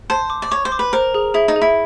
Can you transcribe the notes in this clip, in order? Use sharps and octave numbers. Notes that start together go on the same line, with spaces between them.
C5 A5
D6
D5
C#5 D6
C5
D6
B4
A#4 C5
G#4
E4 G#4
D#4
G#4
E4